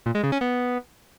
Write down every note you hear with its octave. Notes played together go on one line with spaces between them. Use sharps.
A#2
G#3
C#3
C#4
B3